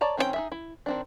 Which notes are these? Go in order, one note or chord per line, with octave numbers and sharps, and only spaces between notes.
C#5 D5 A5 A#5
D#3 C4 C#4 E4 G5
D#4 G#4 E5
E4
D#3 C4 D4